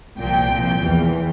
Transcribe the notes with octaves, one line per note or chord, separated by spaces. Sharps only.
C2 A#2 F3 G5
C2 A#2 F3
E2 E3